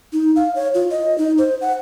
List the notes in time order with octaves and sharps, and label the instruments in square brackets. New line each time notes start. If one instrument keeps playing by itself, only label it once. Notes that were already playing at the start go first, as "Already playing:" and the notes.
[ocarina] D#4
F5
C#5
F4
D#5
D#4
C5
F#5